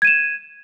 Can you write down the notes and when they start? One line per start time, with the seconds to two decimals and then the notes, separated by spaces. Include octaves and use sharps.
0.02 G#6
0.05 D#7
0.07 E7